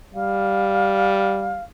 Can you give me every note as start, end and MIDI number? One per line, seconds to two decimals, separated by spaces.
0.15 1.61 55
0.15 1.63 77